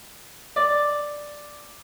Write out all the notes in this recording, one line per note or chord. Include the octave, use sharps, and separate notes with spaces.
D5